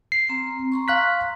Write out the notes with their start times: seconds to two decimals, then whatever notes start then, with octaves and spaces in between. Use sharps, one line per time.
0.12 C7
0.29 C4 A#5
0.72 A#5 C6 C#6
0.88 F5 F#6 B6